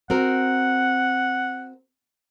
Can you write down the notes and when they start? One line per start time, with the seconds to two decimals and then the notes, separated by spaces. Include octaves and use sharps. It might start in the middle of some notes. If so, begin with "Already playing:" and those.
0.10 C4 F#4 A#4 F#5